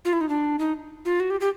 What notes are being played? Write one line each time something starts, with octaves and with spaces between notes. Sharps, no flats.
F4
E4
D#4
D4
D#4
F4
F#4
G4
G4